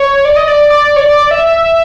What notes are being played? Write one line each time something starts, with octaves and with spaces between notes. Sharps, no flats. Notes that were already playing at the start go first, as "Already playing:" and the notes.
Already playing: C#5
D5
D#5
D5
D5
C#5
D5
E5